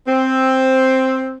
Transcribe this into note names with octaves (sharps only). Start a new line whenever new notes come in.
C4